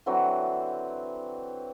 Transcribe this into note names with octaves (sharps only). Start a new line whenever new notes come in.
D3 E3 F#3 C4